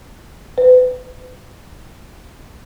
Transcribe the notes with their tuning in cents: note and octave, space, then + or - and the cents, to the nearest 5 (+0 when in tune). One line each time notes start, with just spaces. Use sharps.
B4 +35